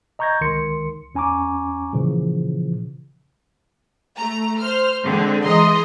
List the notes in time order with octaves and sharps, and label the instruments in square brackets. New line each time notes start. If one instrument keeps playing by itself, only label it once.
[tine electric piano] D#5 A#5 C#6 G6 G#6 A#6
C#2 D#3 A#4 C6 C#7
E2 C#4 G#5 A#5 C#6 D6
A#2 C#3 E3 F3
[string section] A3 A#5
C5 F6
D3 G#3 C4
E3 G#3 D#5 A#5 C6